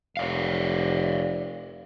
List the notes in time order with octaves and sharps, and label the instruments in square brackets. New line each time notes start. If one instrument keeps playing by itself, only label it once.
[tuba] F1 [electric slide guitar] C#5 D5 F5